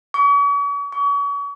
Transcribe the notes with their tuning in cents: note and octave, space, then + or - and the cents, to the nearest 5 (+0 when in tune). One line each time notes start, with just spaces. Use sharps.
C#6 +45
C#6 +40